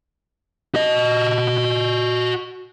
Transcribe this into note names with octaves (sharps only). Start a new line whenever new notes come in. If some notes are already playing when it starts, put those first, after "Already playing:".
F#4 D#5